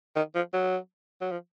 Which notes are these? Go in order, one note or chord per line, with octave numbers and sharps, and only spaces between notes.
D#3
F3
F#3
F#3
F3